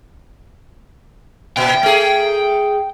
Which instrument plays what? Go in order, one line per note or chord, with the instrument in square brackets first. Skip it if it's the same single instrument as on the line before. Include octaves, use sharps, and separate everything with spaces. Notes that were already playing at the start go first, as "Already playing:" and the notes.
[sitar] A#2 [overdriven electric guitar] G5
[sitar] A3 G#4